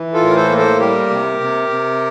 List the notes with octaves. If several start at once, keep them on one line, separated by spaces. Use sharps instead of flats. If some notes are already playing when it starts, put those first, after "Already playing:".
Already playing: E3
F4 A4
A2 A#4
A4 C5
A#3
A4 C5
G3 G4 A#4
C3
C3
C3